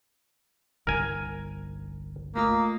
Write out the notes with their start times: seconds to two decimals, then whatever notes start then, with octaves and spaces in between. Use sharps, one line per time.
0.87 G1 C2 A#4 G#5
2.35 A3 A#3 F4 D#6